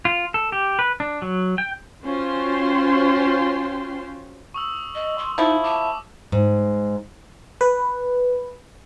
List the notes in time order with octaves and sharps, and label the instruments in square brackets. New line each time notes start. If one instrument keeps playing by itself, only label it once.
[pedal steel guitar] F4
A4
G4
B4
D4
F#3
G5
[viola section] C#4 F4 F#4 C5 G5 C6
[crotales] C#6 D#6 E6
[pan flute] D#5
C6
[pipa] F3 E4 [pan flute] D#4
[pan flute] A5 [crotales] D6
[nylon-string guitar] G#2
[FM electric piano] B4